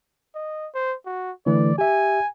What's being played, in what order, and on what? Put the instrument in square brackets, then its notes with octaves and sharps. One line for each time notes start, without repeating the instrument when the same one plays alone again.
[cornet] D#5
C5
F#4
[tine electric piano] D3 E3 A3 [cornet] D5
[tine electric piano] G4 E5 [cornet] G#5